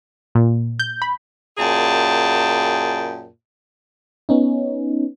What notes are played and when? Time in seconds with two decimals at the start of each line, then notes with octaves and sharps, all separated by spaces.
0.35 A#2
0.79 G6
1.02 B5
1.58 F#2 A#2 G#4 G5 A5
4.29 B3 C#4 D#4